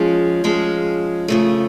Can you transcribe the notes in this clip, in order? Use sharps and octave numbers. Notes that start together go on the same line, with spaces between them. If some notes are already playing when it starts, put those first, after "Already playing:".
Already playing: F3 G#3 C#4
F3 G#3 C#4
F2 C#3 F3 A3